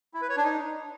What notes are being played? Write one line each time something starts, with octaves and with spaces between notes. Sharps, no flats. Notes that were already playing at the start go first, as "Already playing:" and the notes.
E4
B4
C#5
D4
D#4